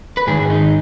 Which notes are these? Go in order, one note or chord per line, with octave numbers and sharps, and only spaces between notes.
B4
G#2 D#3 G#4
D#4